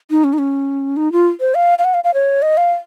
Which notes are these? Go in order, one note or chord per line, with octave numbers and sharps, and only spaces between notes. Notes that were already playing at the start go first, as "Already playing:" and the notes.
D#4
C#4
D#4
C#4
D#4
F4
C5
F5
F5
F#5
F5
F5
C#5
D#5
F5